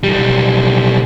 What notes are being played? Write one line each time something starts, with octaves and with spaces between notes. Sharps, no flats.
B1 G3